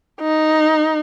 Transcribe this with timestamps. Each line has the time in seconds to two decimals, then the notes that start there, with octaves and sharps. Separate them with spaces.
0.21 D#4